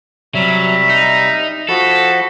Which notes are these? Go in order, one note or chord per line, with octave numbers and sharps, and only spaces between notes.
C3 F#3 G3 E5
D#4
F3 F#4 A4 B5